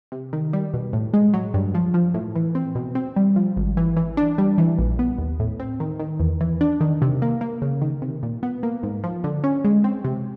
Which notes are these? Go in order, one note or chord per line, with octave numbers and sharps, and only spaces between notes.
C3
D#3
G3
B2
A2
G#3
F#3
G2
F3
F3
A2
E3
C4
B2
C4
G3
F3
G#1
E3
E3
D4
G3
E3
A#1
B3
D#2
A2
C4
D#3
D#3
E2
E3
D4
D#3
C3
A#3
A#3
C#3
D#3
C3
A#2
B3
A#3
G#2
F3
D3
C#4
G#3
C4
C3